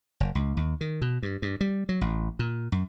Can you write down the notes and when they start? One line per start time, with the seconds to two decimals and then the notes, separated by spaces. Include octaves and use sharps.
0.20 F#1
0.35 C#2
0.57 D#2
0.81 D#3
1.02 B2
1.23 G2
1.42 G2
1.61 G3
1.89 F#3
2.01 A1
2.39 A#2
2.72 F#2